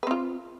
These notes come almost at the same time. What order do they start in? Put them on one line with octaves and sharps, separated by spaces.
B4 C4 F4